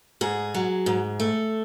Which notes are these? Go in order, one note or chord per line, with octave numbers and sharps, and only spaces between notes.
G#2 G#4
F#3
G#2
A3